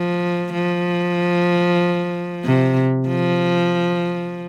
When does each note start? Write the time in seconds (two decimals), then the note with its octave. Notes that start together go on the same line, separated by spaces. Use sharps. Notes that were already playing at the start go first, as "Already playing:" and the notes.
Already playing: F3
0.53 F3
2.45 C3
3.08 F3